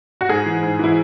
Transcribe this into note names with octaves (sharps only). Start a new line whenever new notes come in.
F#4
G#2 G#4
E3
G#2
E3 E4